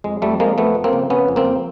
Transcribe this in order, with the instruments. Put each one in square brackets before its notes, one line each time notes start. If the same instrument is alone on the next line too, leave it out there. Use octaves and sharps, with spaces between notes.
[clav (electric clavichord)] F2 G#3
F2 G3 A3
F3 G#3 A#3
F3 A3 B3
F2
A#3 C4
C#3
C#3 B3 C#4
F2
A#3 C4
F2